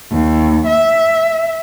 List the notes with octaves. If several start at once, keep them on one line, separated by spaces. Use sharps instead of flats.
D#2
E5